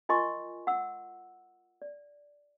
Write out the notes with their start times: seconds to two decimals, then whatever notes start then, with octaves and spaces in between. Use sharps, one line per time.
0.09 F4 A#4 D#5 G#5 C6 C#6
0.67 F#5 E6
1.82 D5